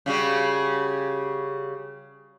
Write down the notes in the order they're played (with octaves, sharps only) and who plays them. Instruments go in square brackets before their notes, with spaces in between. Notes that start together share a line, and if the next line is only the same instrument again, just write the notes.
[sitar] C#3 G3 F#4